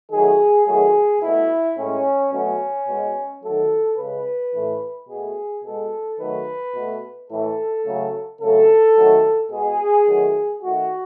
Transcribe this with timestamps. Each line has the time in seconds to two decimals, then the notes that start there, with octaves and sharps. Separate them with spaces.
0.11 D#3 F#3 A3 G#4
0.66 D#3 F#3 A3 G#4
1.22 B2 A3 E4
1.78 A2 G#3 C#4
2.33 B2 F#3 A3 C#4
2.88 B2 G#3
3.43 D#3 F#3 A3 A4
3.98 C#3 G#3 B4
4.53 A2 E3 A3
5.09 B2 A3 G#4
5.64 B2 G#3 A4
6.20 D#3 F#3 A3 B4
6.75 B2 A3
7.31 A2 E3 A3 A4
7.86 C#3 F#3 A3
8.41 C#3 F#3 A3 A4
8.97 D#3 F#3 A3
9.52 B2 G#3 G#4
10.07 D#3 F#3 A3
10.63 D#3 A3 F#4